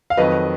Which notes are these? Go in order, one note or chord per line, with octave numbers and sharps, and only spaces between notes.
F5
F2 D#3 F#3 B4 D#5